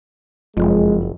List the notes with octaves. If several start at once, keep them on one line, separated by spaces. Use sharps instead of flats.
F#1 F2 G#3